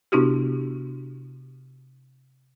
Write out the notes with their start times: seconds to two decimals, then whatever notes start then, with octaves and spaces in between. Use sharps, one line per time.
0.12 C3 B3 D4 E4 F#4 G4